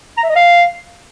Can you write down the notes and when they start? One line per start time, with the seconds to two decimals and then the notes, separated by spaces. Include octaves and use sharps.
0.17 A#5
0.23 E5
0.29 D#5
0.36 F5